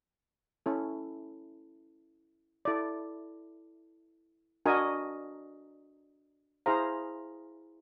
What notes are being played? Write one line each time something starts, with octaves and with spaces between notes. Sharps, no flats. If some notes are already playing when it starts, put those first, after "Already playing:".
C#4 E4 A4
E4 A4 D5
D4 F#4 A#4 D#5 G#5
E4 G#4 C5 F5 A#5